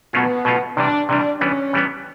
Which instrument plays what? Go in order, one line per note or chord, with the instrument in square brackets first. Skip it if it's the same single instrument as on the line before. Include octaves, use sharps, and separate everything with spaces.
[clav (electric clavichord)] B2 F#3 A3 C#4 F4 [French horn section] B3
[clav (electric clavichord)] B2 F#3 A3 C#4 F4
[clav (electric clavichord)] C3 E3 G3 [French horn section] D4
[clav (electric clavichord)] C3 E3 G3 [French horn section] D4
[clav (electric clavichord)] E3 G3 B3 [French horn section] C#4
[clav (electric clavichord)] E3 G3 B3